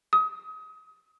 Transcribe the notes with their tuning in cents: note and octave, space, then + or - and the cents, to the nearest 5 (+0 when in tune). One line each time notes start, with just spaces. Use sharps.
D#6 +30